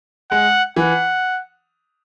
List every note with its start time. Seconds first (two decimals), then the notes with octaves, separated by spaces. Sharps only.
0.31 G#3 F#5
0.76 E3 F#5